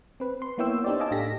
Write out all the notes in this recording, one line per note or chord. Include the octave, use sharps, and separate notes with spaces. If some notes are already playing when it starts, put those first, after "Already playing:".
C4 B4
C6
A#3 B3 E4 C#5 G5 E6
D4 D#4 G4 C5 D5
D#5 F5 G#5 A5 D6 E6
A2 D4 G4 A4 A#6 B6